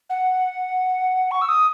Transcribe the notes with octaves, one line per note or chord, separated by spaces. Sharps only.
F#5
C#6
E6
D#6